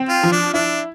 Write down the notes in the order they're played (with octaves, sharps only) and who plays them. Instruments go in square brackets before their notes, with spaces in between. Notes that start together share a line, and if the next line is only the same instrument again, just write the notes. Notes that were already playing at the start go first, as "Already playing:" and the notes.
Already playing: [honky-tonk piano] C4
[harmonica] F4
[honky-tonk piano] F3
[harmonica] D4
[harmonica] D4 [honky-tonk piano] E4